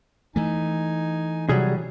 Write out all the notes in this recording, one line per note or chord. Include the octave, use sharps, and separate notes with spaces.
E3 A3 D#4 G#5
C3 F#3 G3 F#4 G#4